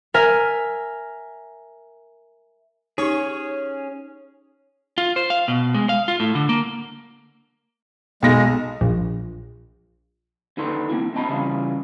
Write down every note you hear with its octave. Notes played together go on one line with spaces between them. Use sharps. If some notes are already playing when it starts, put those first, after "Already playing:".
A#4 E5 G#5 F6
C#4 D#4 G4 G#4 C#5
F4
C5
F5
B2
G#3
F5
F4
A2
D3
A#3
B1 G#3 A#6
A#1
D#2 D3 D#4 A4 B4 C6
A#3 C4 E4
C4 D4 D#5 A5 B5
C#3 E3 G3 E4 F4 G#4